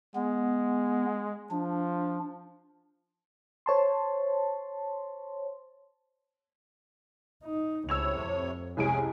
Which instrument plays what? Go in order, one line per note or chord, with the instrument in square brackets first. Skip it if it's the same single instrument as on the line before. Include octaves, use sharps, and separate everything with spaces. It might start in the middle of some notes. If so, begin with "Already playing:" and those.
[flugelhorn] G#3 [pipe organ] B3
[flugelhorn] F3 [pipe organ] D4
[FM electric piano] C5 C#5 A5 C6
[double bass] D#4
[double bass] C#2 [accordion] A2 C3 C#5 [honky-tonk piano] E6 G#6 F7
[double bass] F2
[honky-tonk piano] C2 G#3 D7 [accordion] C#4 G#4 G#5